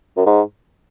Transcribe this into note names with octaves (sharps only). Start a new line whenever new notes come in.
F#2
G#2